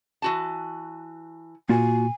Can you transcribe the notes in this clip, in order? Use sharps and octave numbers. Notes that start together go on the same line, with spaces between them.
E3 F#4 A5
A#2 A#3 F4 F#4 G#5